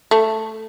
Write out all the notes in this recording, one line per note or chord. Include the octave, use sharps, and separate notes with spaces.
A3